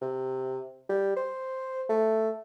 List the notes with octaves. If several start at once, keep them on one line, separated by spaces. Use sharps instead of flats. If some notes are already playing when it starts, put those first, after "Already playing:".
C3
G3
C5
A3